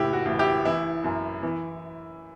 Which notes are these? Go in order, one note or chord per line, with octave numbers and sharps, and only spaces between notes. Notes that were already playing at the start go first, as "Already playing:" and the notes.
Already playing: F#1 A2 E4 G4
F#4
A1
E4 G4
E3 E4
F#2
E3